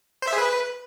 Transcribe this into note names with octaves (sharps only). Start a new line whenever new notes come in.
C5
E5
G#4
B4